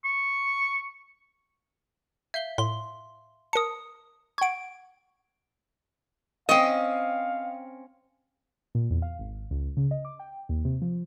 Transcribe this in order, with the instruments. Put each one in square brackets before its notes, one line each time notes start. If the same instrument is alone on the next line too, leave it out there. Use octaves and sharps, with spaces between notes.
[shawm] C#6
[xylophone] E5 F5 G7 [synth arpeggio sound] G6
[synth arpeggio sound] A2 [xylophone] C6 G7
[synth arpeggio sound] A#4 A5 [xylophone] D#6 C#7
[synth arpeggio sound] F#5 C#6 [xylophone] G#6 D7
[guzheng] C4 C#4 [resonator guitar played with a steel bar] D#5 [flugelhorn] F5
[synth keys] A#2
E2
F5
G#1
C#2
C#3
D#5
D6
G5
D#2
C3
F3